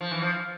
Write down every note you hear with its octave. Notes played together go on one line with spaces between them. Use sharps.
F3
E3
F3